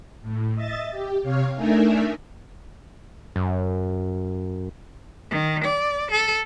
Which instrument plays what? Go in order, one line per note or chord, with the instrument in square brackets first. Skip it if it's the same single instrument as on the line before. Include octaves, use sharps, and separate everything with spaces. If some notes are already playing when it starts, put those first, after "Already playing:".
[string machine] A2
D#5 E5 A6
G4
C3 C#5 F5
A3 D4 D#4 A#4 E5 G#5
[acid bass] F#2
[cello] D#3
D5
A4